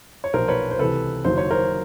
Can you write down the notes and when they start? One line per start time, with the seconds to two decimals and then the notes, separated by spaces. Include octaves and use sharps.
0.24 C#5
0.33 B1 A#2 F3 A#4 C5
0.48 B4 C#5
0.71 C5
0.79 C#2 C3 E3 A4 B4
1.25 F#1 F#2 D#3 F#3 C5
1.38 C#5
1.51 A#4 C5